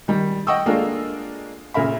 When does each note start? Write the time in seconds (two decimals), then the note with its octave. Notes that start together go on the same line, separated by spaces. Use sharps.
0.08 D#3 G3
0.47 D#5 F#5 G5 C#6 D#6 E6
0.66 G#3 A#3 D4 F4 A4 A#4
1.74 A#2 C#3 A#4 E5 B5